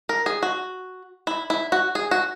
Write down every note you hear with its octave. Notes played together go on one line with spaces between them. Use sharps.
A#4
G#4
F#4
E4
E4
F#4
G#4
F#4